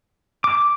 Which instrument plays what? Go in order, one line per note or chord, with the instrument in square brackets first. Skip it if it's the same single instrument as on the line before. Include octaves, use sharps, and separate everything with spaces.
[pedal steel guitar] D6